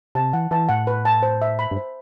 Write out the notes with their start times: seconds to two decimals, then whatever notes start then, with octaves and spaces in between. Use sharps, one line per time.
0.15 C3 A5
0.33 E3 F#5
0.51 E3 A5
0.69 A2 F#5
0.87 B4
1.05 A5
1.23 C5
1.42 E5
1.59 B5
1.71 G2
1.77 C5